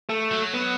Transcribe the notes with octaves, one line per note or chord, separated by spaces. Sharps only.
A3
F#3
B3